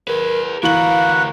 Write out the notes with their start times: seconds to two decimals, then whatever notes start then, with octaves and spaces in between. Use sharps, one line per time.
0.08 G#4 A#4 B4
0.63 D2 E3 F#4 A#4 B4 F5 F#5 F#7